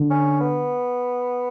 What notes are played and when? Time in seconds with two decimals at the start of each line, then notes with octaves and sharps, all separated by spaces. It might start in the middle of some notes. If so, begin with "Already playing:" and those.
Already playing: D3
0.10 C#4
0.41 B3